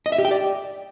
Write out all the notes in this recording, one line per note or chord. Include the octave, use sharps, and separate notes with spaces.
D#5
E5
G4
G5
D5